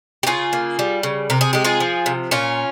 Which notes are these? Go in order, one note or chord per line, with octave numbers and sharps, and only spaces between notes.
G4
C#3 F4 G#4
A#3
G3
C#3
C3 A#4
G#4
G#3 G4
F4 G#4
F3
C3
A#2 C#4 F4